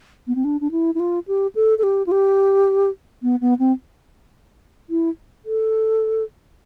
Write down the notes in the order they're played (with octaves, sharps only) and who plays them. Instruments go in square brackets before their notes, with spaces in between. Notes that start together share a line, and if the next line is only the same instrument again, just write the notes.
[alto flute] B3
C4
D4
D4
E4
E4
F4
G4
A4
A4
G4
F4
G4
B3
B3
C4
E4
A4